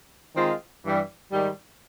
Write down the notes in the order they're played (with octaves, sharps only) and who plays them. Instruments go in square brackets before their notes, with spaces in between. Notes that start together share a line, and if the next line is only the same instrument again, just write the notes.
[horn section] D#3 G#3 C4 F4
G2 E3 G3
G#2 D#3 G3